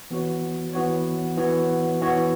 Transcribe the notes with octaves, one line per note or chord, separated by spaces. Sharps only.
E3 B3 F#4 C#5
E3 B3 F#4 C#5
E3 B3 F#4 C#5
E3 B3 F#4 C#5